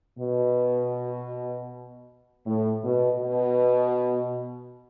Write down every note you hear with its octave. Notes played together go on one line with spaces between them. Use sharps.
B2
A2
B2
B2